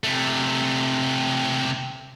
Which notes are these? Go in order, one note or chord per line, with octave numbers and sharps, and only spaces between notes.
C3 A3